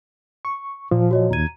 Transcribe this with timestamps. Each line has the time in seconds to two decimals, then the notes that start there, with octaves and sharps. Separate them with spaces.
0.45 C#6
0.91 A#2 F3
1.11 F#4 C#5 D#5
1.31 D#2 A#5 G#6 D#7